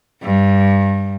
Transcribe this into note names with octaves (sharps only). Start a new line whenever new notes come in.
G2